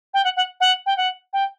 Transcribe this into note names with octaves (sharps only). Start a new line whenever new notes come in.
G5
F#5
F#5
F#5
G5
F#5
G5